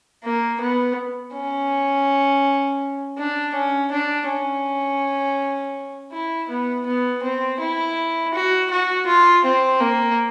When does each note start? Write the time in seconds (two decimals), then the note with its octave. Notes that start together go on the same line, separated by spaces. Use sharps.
0.23 A#3
0.60 B3
1.34 C#4
3.18 D4
3.55 C#4
3.92 D4
4.28 C#4
6.12 E4
6.50 B3
6.86 B3
7.23 C4
7.60 E4
8.34 F#4
8.70 F#4
9.07 F4
9.44 C4
9.80 A#3